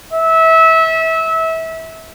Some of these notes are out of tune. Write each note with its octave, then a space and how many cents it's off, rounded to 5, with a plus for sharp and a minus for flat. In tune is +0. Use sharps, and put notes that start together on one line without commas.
E5 -25